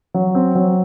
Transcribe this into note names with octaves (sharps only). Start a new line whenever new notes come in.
F#3
C4
F#3